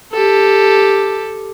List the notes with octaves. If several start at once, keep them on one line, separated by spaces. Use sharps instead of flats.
G4 A4